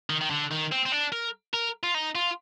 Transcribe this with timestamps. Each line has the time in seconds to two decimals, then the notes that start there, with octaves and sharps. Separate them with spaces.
0.10 D#3
0.21 D#3
0.30 D3
0.51 D#3
0.72 C4
0.86 C4
0.92 D4
1.12 A#4
1.53 A#4
1.83 F4
1.94 D#4
2.15 F4